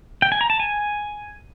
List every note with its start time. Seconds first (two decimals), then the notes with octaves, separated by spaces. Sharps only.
0.22 G5
0.32 G#5
0.41 A#5
0.50 A5
0.60 G#5